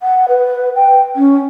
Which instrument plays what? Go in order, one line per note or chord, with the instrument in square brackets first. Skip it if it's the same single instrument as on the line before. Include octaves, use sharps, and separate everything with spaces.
[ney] F#5
B4
G5
C#4